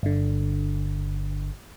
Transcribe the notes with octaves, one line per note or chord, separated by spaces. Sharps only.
G1 D3